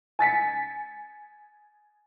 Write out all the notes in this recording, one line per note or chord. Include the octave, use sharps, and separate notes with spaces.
G#5 A6 B6 C#7